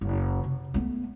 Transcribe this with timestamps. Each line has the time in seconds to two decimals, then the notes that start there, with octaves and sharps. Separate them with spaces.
0.01 F#1
0.44 C3
0.74 A3 B3